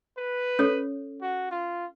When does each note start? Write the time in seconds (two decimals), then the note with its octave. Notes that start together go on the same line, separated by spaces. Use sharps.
0.18 B4
0.59 C#4 A4 C#5
1.22 F#4
1.51 F4